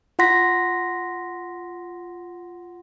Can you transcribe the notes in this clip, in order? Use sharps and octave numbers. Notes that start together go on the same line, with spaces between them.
F4 F#5 C6 A#6 B6